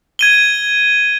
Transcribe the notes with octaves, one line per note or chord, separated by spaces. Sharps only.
G#6 D#7 G7